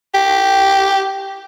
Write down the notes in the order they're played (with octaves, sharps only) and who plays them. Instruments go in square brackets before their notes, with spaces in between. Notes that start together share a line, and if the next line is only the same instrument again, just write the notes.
[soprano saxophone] G4